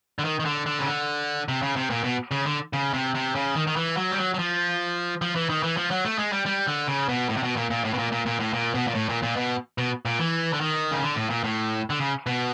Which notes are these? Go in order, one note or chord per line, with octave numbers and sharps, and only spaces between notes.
D3
D#3
D#3
D3
D3
C#3
D3
C3
C#3
C3
A#2
B2
C#3
D3
C#3
C3
C3
C#3
D#3
D#3
E3
F#3
G3
F#3
F#3
F3
F3
E3
D#3
E3
F3
F#3
A3
G#3
G3
G3
D3
C#3
B2
A2
C3
B2
A#2
A#2
A2
B2
A#2
A#2
A#2
A2
A#2
B2
A#2
A2
A#2
A#2
B2
B2
A#2
E3
D3
D#3
C#3
D3
A2
A#2
A2
D3
C#3
B2